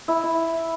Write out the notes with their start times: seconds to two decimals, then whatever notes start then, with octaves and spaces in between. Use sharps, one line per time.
0.08 E4
0.23 E4